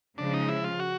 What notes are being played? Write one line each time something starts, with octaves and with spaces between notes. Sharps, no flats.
C#3 F3 G#3 D4
D#4
E4
F4
F#4